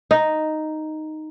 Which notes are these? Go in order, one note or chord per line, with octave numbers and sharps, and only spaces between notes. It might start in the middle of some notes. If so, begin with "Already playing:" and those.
D#4